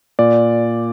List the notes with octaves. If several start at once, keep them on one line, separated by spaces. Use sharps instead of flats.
A#2 D5